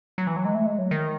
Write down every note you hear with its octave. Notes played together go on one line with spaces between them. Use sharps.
F#3
E3
F#3
G#3
A3
G#3
F#3
D#3